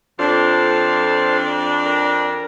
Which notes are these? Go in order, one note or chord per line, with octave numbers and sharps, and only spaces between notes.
F2 D4 F4 A4 C5
A#4